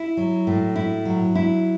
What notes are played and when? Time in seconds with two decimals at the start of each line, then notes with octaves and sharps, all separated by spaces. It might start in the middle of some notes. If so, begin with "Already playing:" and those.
Already playing: E4
0.17 F#3
0.47 A2
0.76 E4
1.05 F#3
1.35 E4